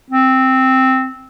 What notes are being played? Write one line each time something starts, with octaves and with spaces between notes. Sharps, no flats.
C4